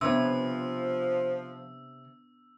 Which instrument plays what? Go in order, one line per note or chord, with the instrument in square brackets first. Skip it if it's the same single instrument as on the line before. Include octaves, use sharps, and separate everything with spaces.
[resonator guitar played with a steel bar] C3 B4 C#5 [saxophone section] F3 [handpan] B3 D4 [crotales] E6